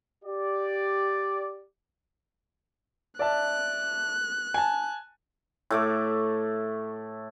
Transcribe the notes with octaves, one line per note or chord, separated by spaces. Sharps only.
G4 D5
D5 E5 A5 F#6
G#5 A5
A2 A3 D6